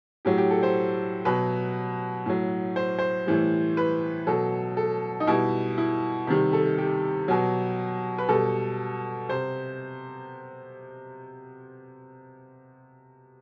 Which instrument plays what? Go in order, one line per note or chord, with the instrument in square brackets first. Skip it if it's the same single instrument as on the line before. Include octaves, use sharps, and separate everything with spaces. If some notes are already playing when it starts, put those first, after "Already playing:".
[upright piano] A2 F#3 G4
G4
A4
C5
B2 F#3 B4
A2 F#3
C5
C5
A2 E3 G3
B4
B2 F#3 A4
A4
D#4
B2 G3 E4
E4
C3 D#3 G3
A4
G4
B2 F#3
B4
B2 G3 A4
C3 C5